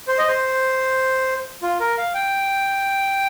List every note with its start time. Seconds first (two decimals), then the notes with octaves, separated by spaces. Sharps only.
0.08 C5
0.18 D#5
0.27 C5
1.63 F4
1.80 A#4
1.98 F5
2.14 G5